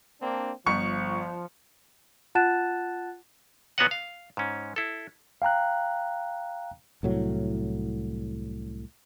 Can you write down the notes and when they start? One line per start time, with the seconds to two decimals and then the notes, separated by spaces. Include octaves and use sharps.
0.21 A#3 C4 D4
0.66 G1 F3 C#6 C#7
2.35 F4 F#5 A5 F#6 A6 E7
3.78 A#2 B3 F#4 C#5 D#5 F#5
3.91 F5
4.37 G#2 C#4
4.76 E4 A4
5.42 F5 G5 A#5 F#6
7.03 C2 A2 F#3